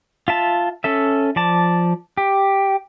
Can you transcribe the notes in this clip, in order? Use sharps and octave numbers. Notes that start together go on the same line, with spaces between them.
F4 E5 A5
C#4 A4 E5
F3 D5 A5
G4